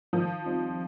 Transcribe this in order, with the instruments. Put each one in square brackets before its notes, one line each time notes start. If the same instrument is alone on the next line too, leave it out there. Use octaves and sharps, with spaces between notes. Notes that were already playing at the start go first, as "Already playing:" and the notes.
[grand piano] D#3 [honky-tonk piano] F3
[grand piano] G3 C4 D#4